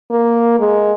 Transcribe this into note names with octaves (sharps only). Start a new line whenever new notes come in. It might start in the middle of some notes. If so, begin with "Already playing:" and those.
A#3
G#3